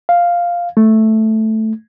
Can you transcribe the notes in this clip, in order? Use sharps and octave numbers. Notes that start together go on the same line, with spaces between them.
F5
A3